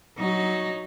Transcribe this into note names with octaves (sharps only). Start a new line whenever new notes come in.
F#3 D#4